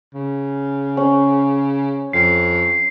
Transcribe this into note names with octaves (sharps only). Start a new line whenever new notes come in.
C#3
C#4
F2 C7